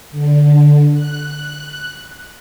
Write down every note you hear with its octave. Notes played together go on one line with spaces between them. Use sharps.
D3
F#6